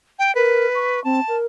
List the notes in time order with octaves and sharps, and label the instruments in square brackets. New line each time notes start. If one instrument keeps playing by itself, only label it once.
[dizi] G5
[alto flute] A#4 [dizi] B4
[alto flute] C#6
[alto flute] C4 [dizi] A5
[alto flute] A#4